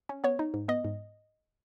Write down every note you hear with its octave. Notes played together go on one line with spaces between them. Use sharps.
C#4
B3 C#5
D#4
G#2
B3 D#5
G#2